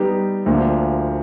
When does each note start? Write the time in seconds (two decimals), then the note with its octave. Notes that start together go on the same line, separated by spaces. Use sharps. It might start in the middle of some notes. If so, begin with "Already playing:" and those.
Already playing: G3 B3 D#4 G4
0.46 D2 D3 F3 A#3